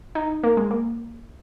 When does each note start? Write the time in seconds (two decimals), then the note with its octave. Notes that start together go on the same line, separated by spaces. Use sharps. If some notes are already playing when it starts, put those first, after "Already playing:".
0.15 D#4
0.43 A#3
0.57 G#3
0.71 A#3